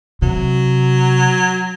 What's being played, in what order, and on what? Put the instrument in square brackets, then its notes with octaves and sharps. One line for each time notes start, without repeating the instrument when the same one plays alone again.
[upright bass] C3 [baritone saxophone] F#3